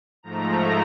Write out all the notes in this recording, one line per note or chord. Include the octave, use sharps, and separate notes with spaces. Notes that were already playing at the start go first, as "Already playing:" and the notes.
G#2 F3 A3 A#5